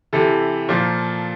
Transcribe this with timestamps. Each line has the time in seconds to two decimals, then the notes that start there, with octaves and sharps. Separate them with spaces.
0.13 C3 E3 A4
0.69 A#2 F3